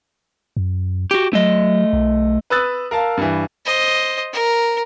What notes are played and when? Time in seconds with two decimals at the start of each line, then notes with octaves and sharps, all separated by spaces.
0.57 F#2
1.11 F#4 G4
1.33 F#3 A3 D#5
1.93 B1
2.50 B4 B5 D#6 E6 F#6 A6
2.91 A#4 F5 A5
3.17 G2 E3
3.65 C5 D#5
4.33 A#4